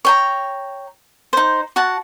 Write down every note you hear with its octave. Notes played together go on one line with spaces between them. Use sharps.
C#5 G5 A#5
D#4 C5
F#4 F#5 A5